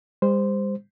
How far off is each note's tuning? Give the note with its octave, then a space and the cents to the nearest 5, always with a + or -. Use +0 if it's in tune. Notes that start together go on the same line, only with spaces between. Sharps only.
G3 +45 C5 -10